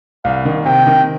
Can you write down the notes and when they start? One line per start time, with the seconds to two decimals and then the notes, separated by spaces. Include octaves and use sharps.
0.24 C2 F5
0.45 D#3
0.66 C3 G5
0.87 D#3